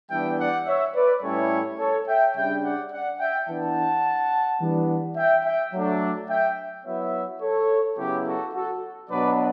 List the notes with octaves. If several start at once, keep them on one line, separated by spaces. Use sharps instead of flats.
E3 G3 B3 D4 E5 G5
D5 F#5
C#5 E5
B4 D5
A2 G3 C#4 E4 A4 C#5
A4 C#5
E5 G5
C#3 G3 D4 E5 G5
D5 F#5
D5 F#5
E5 G5
E3 B3 D4 F#5 A5
E3 G3 B3 D4
E5 G5
E5 G5
F#3 A3 D4
E5 G5
F#3 B3 E4 C#5 E5
A4 C#5
C#3 F#3 B3 E4 G4
F#4 A4
F#4 A4
B2 F#3 B3 D4 B4 D5